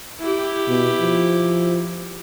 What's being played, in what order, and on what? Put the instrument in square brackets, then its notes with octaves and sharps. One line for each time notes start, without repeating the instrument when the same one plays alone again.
[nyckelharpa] E4 G4
[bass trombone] B2
F3